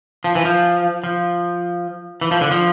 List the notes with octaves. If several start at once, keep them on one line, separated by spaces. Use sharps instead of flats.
F3
E3
F3
F3
E3
F3
D3
F3